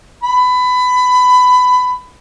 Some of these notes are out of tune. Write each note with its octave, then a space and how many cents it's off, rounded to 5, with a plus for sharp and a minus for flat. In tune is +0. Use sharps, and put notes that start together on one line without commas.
B5 +20